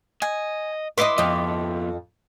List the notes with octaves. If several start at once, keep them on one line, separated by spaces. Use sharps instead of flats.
D#5 G#5
E4 B4 D#5 C6 D6
F2 F3 B3 D#5